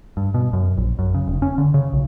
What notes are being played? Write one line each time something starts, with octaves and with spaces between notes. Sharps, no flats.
G2
B2
F#2
A#1
F#2
C#3
F1
C#4
D3
C#3
B1